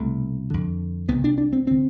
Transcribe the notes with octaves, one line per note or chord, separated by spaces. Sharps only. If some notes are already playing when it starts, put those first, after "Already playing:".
Already playing: C2 B2 A3
F2 D3
C2 C3 B3
D4
D4
C4
D3 C4